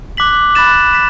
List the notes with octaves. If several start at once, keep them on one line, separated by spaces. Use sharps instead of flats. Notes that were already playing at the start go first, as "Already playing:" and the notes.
D6 F#6 B6 F#7
B5 F#6 A6 E7
B6 E7